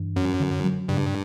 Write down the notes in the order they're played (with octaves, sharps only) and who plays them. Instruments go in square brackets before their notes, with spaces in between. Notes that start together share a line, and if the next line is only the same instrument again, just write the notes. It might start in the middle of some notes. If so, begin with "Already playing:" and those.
Already playing: [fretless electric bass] G2 E3
[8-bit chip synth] F#2 [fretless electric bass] C#4
[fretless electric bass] D3
F#3
[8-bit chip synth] G2 [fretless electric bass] C#3